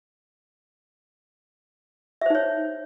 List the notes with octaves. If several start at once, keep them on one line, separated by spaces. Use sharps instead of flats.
D#4 C5 C#5 E5